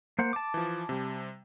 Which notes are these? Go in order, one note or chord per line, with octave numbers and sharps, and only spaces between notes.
A#3 C5 F#5
A5 D6
E3 F3
C3 G3